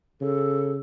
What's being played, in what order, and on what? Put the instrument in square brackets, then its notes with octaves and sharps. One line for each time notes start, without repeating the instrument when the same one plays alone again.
[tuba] C#3 [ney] A4